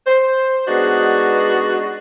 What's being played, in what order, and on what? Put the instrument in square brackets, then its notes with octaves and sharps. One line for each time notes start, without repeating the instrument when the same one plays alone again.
[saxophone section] C5
G#3 B3 D4 D#4 F#4